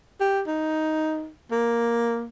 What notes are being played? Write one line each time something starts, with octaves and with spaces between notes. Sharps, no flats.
G4
D#4
A#3